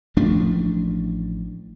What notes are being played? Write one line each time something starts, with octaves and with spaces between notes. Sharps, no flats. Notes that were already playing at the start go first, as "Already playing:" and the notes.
A1 F3 A3 D4